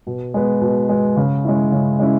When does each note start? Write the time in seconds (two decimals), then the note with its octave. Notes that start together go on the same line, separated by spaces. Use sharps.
0.07 B2
0.34 G#3 B3
0.61 B2
0.89 G#3 B3
1.17 C#3
1.44 G#3 C#4 E4
1.72 C#3
1.99 G#3 C#4 E4